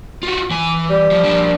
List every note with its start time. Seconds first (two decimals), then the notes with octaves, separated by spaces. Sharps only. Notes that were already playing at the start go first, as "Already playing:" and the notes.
0.23 F4 F#4
0.51 E3 G#5
0.90 G3
1.11 F3
1.24 F3 D4